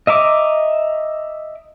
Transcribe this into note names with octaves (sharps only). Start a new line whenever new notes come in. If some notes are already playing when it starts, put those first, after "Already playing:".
D#5 E5 A#5 D6